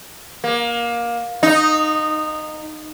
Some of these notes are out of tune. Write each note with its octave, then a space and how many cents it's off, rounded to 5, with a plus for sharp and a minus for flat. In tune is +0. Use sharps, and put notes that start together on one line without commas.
A#3 +20
D#4 -15